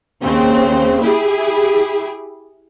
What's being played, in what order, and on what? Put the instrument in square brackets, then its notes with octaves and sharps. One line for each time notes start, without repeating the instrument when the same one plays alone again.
[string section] D#2 C#3 C4
E4 G4 G#4